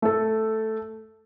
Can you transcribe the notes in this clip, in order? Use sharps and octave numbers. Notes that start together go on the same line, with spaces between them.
A3 A4